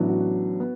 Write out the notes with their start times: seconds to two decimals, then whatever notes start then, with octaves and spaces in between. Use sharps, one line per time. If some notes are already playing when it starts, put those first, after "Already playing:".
Already playing: A1 A2 F#3 B3 D4
0.08 F#4
0.60 B3